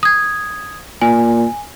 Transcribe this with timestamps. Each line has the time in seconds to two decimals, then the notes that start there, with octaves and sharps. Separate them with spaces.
0.03 D#6 G#6
1.01 A#2 G#5